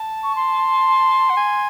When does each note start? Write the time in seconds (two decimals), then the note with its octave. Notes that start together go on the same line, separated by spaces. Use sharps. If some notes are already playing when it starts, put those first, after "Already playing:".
Already playing: A5
0.23 C#6
0.36 C6
1.30 F#5
1.37 G#5